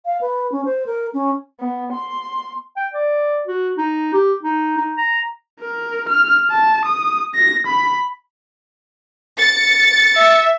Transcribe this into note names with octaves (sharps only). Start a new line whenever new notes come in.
F5
B4
C#4
C5
A#4
C#4
B3
C6
G5
D5
F#4
D#4
G4
D#4
D#4
A#5
A#4
F6
A5
D#6
A#6
B5
A6 C#7
E5